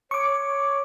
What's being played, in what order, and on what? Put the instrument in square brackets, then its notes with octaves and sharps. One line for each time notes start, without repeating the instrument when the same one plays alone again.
[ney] C#5 [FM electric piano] C#6 D6